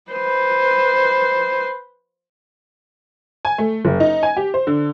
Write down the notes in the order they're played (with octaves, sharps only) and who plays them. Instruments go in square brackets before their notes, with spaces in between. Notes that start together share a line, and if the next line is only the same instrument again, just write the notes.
[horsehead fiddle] B4 C5
[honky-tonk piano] G#5
A3
F#1
D#4
G#5
G4
C5
D3